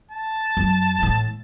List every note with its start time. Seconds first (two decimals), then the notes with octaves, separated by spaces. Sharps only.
0.11 A5
0.57 F#2
0.98 A2 E3